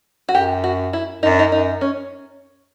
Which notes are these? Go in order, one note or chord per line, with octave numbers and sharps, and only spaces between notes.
F#4
F#2 G4
F#4
E4
F#2 D#4
D4
D#4
F#2 D#4
C#4